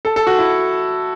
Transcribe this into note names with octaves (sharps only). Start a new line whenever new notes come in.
A4
A4
F#4
E4